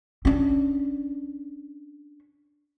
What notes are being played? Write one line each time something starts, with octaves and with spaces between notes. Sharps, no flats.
C#4 D4